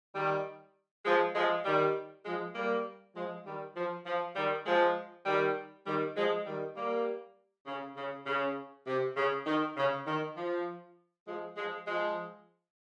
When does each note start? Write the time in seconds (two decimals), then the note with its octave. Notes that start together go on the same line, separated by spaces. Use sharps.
0.15 D#3 G3
1.05 F3 G#3
1.35 F3 G#3
1.65 D#3 G3
2.25 F3 G#3
2.55 G3 A#3
3.16 F3 G#3
3.46 D#3 G3
3.76 F3
4.06 F3
4.36 D#3 G3
4.66 F3 G#3
5.26 D#3 G3
5.86 D#3 G3
6.16 F3 G#3
6.46 D#3 G3
6.77 G3 A#3
7.67 C#3
7.97 C#3
8.26 C#3
8.87 C3
9.16 C#3
9.47 D#3
9.77 C#3
10.07 D#3
10.37 F3
11.27 F3 G#3
11.57 F3 G#3
11.87 F3 G#3